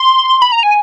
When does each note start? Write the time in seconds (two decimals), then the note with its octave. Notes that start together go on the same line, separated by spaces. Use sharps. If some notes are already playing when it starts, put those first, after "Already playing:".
Already playing: C6
0.42 B5
0.52 A#5
0.63 G#5